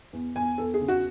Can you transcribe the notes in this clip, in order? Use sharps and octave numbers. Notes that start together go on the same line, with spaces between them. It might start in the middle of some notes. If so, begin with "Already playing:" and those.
E2
E2 G#5
E2 A4
G#4
C#3
F#4